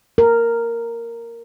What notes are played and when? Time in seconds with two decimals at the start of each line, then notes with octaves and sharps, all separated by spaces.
0.18 A#4